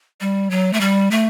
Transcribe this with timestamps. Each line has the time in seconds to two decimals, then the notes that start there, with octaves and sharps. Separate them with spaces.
0.21 G3
0.51 F#3
0.73 A3
0.81 G3
1.11 A3